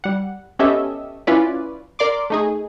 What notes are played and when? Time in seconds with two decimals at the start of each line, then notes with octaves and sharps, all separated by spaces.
0.04 G3 F#5
0.59 B3 C#4 G4 A4 D#5 E5
1.27 C#4 E4 F4 B4 D5
1.99 A#4 D5 C6 D6
2.30 A3 D#4 G#4